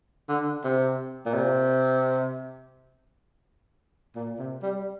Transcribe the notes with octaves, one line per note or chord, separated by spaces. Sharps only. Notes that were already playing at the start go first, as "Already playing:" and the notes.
D3
C3
A#2
C3
A#2
C3
G3